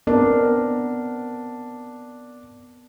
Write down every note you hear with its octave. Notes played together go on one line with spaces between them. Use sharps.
B3 C4 D4 A#4